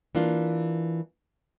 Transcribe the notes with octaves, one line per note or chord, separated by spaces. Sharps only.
E3 A#3 D4 F4